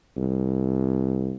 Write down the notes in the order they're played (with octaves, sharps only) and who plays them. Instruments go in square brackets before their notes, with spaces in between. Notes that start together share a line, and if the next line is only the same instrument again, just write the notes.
[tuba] C2